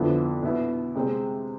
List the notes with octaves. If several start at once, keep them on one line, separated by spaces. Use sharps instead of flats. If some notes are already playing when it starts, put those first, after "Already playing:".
Already playing: F2 D3 F3 B3 E4
B2 B3 E4
C3 G#3 C4